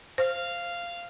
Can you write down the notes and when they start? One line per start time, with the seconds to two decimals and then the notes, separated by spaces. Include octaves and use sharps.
0.18 C5 F5